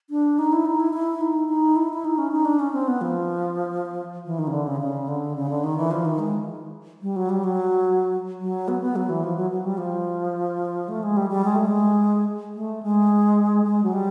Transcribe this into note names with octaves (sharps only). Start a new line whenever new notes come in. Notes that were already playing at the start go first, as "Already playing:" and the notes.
D4
D#4
E4
D#4
E4
E4
D#4
D#4
E4
E4
D#4
C#4
D#4
D4
C#4
C4
B3
F3
E3
D#3
C#3
D3
C#3
C#3
D3
C#3
D3
D#3
E3
F3
D#3
G#3
G3
F#3
G3
F#3
F#3
B3
B3
F#3
E3
F3
F#3
F#3
G3
F3
A3
G#3
G3
G3
G#3
A3
G#3
A3
G#3
G#3
F#3
G3